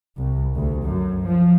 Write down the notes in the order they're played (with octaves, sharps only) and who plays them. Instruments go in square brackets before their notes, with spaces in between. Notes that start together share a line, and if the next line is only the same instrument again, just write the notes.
[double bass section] C2
D2
F#2
F3